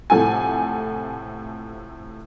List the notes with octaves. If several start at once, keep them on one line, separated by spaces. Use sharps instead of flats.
A2 C3 F3 A4 F#5 G#5